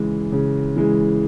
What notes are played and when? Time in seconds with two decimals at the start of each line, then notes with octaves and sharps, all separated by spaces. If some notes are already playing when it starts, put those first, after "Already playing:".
Already playing: C#3 E3 G#3
0.32 C#3
0.76 E3 G#3